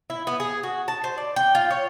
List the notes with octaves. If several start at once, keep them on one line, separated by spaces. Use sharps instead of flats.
E4
B3
G#4
F#4
A5
C5
D5
G5
F4
C#5